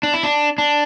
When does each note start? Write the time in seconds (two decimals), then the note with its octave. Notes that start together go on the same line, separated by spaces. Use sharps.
0.03 D4
0.14 E4
0.23 D4
0.58 D4